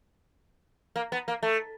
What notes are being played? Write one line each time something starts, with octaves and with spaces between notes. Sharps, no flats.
A#3
B3
A#3
A3